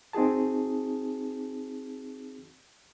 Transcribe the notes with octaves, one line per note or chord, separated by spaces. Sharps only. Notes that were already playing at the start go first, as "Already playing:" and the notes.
C4 D#4 F#4 G#4 A5